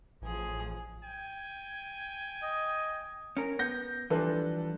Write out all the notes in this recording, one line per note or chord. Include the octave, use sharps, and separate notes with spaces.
A1 F3 G#4
G5 G#5
D#5
C#4 A#4
B3 G6 A#6
E3 F3 G3 D4 A4 B4